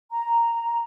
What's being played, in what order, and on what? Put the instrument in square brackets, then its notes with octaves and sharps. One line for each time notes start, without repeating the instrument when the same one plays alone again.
[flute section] A#5